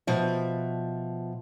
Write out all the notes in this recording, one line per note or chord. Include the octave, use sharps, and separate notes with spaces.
B2 F3 E5